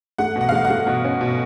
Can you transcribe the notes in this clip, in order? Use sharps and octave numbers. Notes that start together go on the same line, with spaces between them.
A3 F#5
B2
F#5
F5
A3 F#5
F#5
A3
B2
C#4
B2